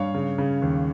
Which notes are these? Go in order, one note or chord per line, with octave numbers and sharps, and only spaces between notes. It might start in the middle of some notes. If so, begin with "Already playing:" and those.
Already playing: G2 C#5 F5
C#3
C#3
D#2